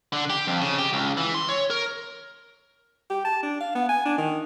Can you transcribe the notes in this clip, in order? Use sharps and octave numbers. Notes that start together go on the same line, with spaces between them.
D3
G4
F2
C#3
G4
C#2
E3
C6
C#5
A#4
G4
A5
D4
F5
B3
G#5
D4
D#3